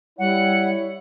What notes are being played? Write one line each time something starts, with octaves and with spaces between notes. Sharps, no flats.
G3 E4 C#5 F#5